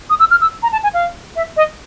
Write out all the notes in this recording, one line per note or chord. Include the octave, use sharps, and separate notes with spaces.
D#6
E6
F6
E6
A#5
A5
G#5
F5
E5
D#5